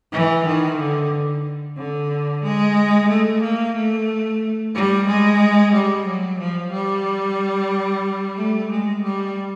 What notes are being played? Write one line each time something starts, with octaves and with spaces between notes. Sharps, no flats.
E3
D#3
D3
D3
G#3
A3
A#3
A3
G3
G#3
G3
F#3
F3
G3
A3
G#3
G3